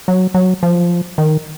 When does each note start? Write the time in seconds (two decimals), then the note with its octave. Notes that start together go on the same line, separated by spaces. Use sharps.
0.08 F#3
0.34 F#3
0.63 F3
1.18 D#3